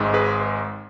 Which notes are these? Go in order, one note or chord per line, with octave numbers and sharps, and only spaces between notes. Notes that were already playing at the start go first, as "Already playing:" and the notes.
Already playing: G#1 G#2 G#3
G#4 B4